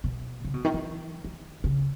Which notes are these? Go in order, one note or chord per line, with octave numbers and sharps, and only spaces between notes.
B2
C#3
B2
D#3
E3
D#3
C#3